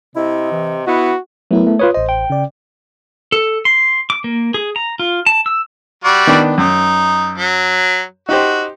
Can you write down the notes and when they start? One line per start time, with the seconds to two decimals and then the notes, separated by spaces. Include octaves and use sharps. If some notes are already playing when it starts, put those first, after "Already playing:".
0.16 C3 E4 D#5
0.52 E3
0.87 B3 E4 F#4
1.51 F#3 A3 B3 E4 A#4
1.67 A3
1.79 F4 B4 C#5 D#6
1.94 A1 C5 D#5
2.09 G5
2.30 C#3 D5
3.32 A4
3.65 C6
4.10 D6
4.24 A#3
4.54 G#4
4.76 A#5
4.99 F4
5.26 A5
5.46 E6
6.04 G3 F#4 D5
6.27 D#3 B3 D4
6.58 F#2 D#4
7.38 F#3
8.29 D#4 F#4 G4 C5